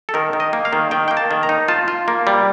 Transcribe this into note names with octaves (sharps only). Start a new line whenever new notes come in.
A4
D#3 A#4
D#3
D#5
A#3
F5
D#3
D#3 G5
A#3 G5
A5
D#3
A#5
D#4
F4 A5
F4
A#3
G3